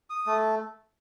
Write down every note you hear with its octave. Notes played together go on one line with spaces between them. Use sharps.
D#6
A3